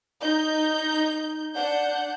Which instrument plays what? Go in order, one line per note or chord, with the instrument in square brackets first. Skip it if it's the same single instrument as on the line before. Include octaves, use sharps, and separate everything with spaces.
[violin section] D#4 G6
D4 F#5 G6